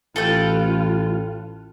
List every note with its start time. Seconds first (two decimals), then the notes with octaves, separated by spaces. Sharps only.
0.16 A1 F4 A4 B4 G5